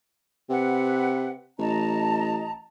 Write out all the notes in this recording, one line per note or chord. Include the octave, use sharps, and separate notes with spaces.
C3 B4 F#5
A1 D#5 A5 A#5